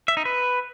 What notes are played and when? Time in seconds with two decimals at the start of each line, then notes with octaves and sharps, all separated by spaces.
0.08 E5
0.17 D#4
0.25 B4